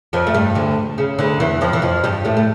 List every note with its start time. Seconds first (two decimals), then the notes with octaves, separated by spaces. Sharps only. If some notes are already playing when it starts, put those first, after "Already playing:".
0.13 F2 F3
0.27 A3
0.34 G2 G3
0.55 D2 D3
0.98 C#3
1.19 D2 D3
1.40 E2 E3
1.61 F2 F3
1.73 E3
1.82 F2 F3
2.04 G2 G3
2.25 A2 A3
2.37 A3